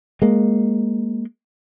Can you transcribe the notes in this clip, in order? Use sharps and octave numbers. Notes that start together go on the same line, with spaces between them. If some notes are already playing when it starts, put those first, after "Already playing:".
G#3 A#3